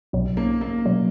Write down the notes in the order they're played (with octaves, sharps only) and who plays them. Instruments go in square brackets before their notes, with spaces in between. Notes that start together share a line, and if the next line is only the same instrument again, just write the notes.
[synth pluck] B1 B2 F#3
[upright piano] A#3
A#3
[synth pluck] B2 F#3